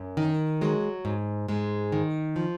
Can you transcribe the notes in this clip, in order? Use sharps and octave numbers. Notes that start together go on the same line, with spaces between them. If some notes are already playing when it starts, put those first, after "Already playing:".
Already playing: F#2
D#3
F#3 G#3
G#2
G#2 G#3
D#3
F3